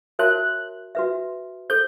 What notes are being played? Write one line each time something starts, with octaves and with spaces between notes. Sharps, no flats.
F#4 A#4 C#5 E5 A5 F#6
F#4 B4 E5
A4 C5 G6